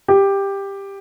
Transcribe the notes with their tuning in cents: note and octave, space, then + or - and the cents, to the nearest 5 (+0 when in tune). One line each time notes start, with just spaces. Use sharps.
G4 +10